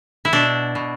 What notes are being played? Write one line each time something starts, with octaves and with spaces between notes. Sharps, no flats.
E4
B2 D4
B2